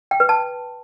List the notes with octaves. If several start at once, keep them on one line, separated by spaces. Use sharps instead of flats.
G5
B4
A5